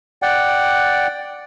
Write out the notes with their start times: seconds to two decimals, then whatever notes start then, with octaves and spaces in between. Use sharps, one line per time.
0.22 D5 F#5 G5